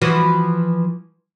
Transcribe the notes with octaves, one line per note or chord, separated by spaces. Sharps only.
E3 F3 F#4